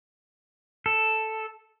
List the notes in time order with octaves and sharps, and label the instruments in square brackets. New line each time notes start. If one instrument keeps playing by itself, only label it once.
[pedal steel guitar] A4